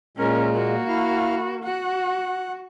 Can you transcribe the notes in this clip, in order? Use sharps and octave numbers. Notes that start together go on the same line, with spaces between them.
A#2 G#3 C#4 A#4
A#3 F#4
E4 F5
F#4 F#5